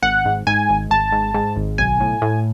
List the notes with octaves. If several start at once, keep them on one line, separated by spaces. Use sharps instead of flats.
G#1 F#5
G#2
G#2 G#5
G#1
G#1 A5
G#2
G#2
G#1
B1 G#5
A2
A2